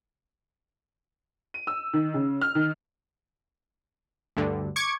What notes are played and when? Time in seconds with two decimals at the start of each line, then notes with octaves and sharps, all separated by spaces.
1.54 D#7
1.67 E6
1.93 D#3
2.14 C#3
2.41 F6
2.55 D#3
4.37 D2 G2 D3
4.76 C#6 D6 G#6 C#7